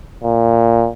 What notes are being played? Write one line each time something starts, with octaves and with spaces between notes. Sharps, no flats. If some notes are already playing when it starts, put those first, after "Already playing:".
A#2